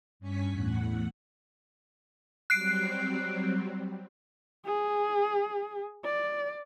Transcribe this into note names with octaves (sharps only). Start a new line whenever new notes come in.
G2 C#4 G#5 C#6 B6
E2 A2 F#5
F#3 G3 C4 F#6 C7 D7
G#4
D5